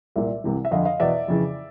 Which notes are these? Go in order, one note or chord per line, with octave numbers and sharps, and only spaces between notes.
C2 A#2 D5 E5
C2 C3 E3
E5
F2 D3 D#5 F5
D#5 F5
E2 B2 D5 E5
F2 C#3 E3